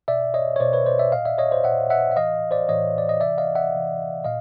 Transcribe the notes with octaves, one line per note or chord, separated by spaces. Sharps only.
B2 D5 E5
C#5 D#5
C#5
B2 C5 D5
B4 C#5
C5 D5
D5 E5
A#2 D#5 F5
D5 E5
C#5 D#5
C5 D5
A#2 E5 F#5
E5 F#5
E5
A2 E3 D#5 F5
C5 D5
A2 E3 C#5 D#5
D5
D#5
C3 E3 D5 E5
D#5 F5
E5 F#5
C3 E3
A#2 D#5 F5